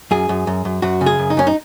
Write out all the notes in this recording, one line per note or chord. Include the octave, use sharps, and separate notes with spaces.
F#2 G#4
F#2
F#2
F#2
F#2 F#4
C#3
G#4
F#2
D#4
F#2 C#4
D#4